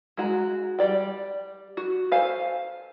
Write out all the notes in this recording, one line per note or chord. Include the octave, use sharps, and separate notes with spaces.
G#3 F#4 A#5
G3 D5 G5
F#4
A4 C5 F5 G#5